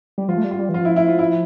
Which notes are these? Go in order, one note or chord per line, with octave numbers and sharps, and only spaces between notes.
G3
F3 F4
A3
G3
F4
G3
E3
F3 F4
E4
E4
F4
E4